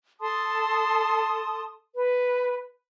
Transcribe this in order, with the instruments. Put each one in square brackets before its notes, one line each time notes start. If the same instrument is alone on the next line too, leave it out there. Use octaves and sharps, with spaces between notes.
[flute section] A4 A5 C6 D#6
B4